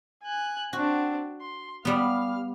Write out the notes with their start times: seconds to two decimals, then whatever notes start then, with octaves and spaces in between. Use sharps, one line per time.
0.24 G#5 F#6
0.73 C4 D4 F#4
1.41 C6
1.85 G3 B3 F5 F6